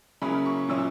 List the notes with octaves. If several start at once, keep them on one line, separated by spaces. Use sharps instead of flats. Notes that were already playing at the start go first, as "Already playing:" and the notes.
C#3 F#3 A#3 C#4 E4 B5
C#6
A#2 F#3 C#4 E4 E6